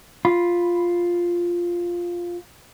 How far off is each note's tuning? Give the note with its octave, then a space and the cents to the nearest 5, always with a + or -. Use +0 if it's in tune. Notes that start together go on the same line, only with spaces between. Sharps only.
F4 +0 B5 +0